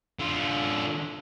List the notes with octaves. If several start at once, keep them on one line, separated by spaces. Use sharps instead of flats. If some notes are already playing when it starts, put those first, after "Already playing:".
D3 F4